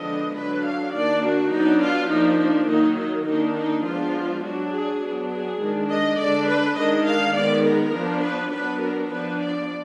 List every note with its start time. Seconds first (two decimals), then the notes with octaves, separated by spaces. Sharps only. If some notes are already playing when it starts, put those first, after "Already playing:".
Already playing: D3 F3 G#3 B3 D4 D#5
0.36 D3 F#3 D4 B4
0.64 F5
0.93 D#3 A#3 D4 D5
1.23 F#4
1.51 F#3 B3 D4 D#4
1.81 F4
2.10 F3 A#3 D4 D#4
2.39 D4
2.68 D#3 F#3 A#3 D#4
2.97 D#4
3.26 D#3 A#3 D4 D#4
3.56 D#4
3.85 F3 G#3 B3 D4 F4
4.43 F#3 D4 F#4
4.72 G#4
5.01 F#3 B3 D4
5.31 G#4
5.60 D#3 G#3 D4
5.89 D#5
6.18 D3 G#3 D4 D5
6.47 B4
6.76 D#3 G#3 D4 D#5
7.05 F5
7.34 D#3 G#3 B3 D5
7.63 A#4
7.93 F3 B3 D4
8.22 B4
8.51 F#3 B3 D4 B4
8.80 A#4
9.10 F3 B3 D4 B4
9.38 D5